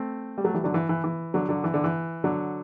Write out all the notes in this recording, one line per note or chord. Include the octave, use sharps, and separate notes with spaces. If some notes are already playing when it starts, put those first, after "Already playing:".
Already playing: A3 C4
G3
F#3 A3
E3 G3
D3 F#3
E3
E3
E3
D3 F#3
D3 F#3
E3
D3
E3
D3 F#3